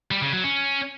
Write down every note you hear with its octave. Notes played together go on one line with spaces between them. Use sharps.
G3
C#3
F#3
C#4